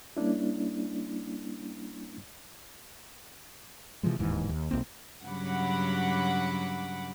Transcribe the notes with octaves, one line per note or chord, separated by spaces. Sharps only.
G3 A#3 C#4 D4 E4
C3 E3 F3 G#3
D1 D#2 G#2 E3
D#2
B1 F2 A#3 C4
G2 C#3 F#3 F#5 B5 D6